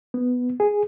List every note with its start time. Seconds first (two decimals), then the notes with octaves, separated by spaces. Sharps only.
0.14 B3
0.60 G#4